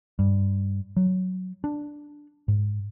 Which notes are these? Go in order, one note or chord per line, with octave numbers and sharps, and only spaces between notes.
G2
F#3
D4
G#2